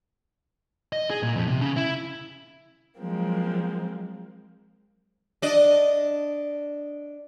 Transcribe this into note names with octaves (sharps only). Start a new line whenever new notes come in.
D#5
G#4
A#2
F2
C3
C#3
E4
F3 F#3 G#3 A#3 C4
D4 D5 D#5